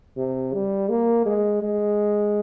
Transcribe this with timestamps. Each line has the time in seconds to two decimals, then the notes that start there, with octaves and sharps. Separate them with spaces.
0.17 C3
0.54 G3
0.89 A#3
1.26 G#3
1.62 G#3